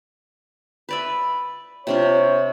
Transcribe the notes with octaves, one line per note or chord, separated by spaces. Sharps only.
B4 D5 E5
C3 D4 F4 C#5